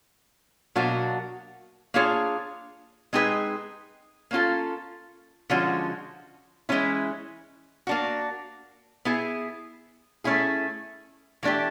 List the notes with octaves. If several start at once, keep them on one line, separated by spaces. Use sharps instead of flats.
B2 F#3 A#3 D4 F#4
A#3 D4 F4 G#4 C#5
G#3 C4 D#4 G#4 B4
A#3 C#4 F4 A4
D3 F3 G#3 C#4 F#4
E3 G#3 C#4 E4
A#3 D4 F#4
B3 E4 G#4
A3 C#4 E4 G#4
E3 A3 D4 G4